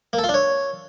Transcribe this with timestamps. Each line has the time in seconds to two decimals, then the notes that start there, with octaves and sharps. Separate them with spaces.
0.13 A#3
0.18 A4
0.24 F4
0.29 D4
0.34 C#5